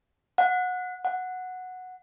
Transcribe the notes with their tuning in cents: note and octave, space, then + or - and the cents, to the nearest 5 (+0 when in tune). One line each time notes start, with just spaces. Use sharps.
F#5 -20
F#5 -5